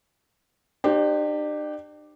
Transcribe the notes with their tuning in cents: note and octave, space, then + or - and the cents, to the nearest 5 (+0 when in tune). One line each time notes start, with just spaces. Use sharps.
D4 +45 G4 +0 C5 +15